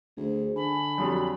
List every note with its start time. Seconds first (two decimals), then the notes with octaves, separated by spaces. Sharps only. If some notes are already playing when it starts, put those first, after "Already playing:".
0.17 D2 G#4 C5
0.56 D3 G#5 A5 B5
0.98 F2 F#3 G3